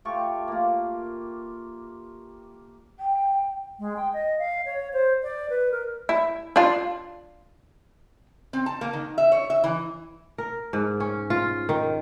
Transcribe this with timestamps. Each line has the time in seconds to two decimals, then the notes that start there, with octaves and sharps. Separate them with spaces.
0.05 A3 F4 G4 C#6
0.48 A#3 F4
2.99 G5
3.79 G#3
3.96 G5
4.13 D#5
4.39 F5
4.65 C#5
4.93 C5
5.23 D5
5.50 B4
5.71 A#4
6.09 E4
6.56 D4 F4
8.53 C4
8.66 A5
8.81 A#3
8.93 D#3
9.18 E5
9.32 C#5
9.50 E5
9.64 E3
10.38 A#4
10.73 G#2
11.00 C#4
11.30 F4
11.69 D#3